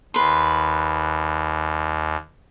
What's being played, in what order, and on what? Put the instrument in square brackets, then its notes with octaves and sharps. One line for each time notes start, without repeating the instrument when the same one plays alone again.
[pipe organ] D#2 [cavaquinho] B4 C6